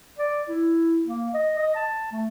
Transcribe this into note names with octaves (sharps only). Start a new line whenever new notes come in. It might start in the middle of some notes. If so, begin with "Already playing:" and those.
D5
E4
A#3
D#5
D#5
A5
A3